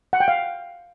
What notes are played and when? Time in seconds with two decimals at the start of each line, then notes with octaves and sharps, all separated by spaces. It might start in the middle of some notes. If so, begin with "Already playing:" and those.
0.13 F#5
0.20 G5
0.28 F5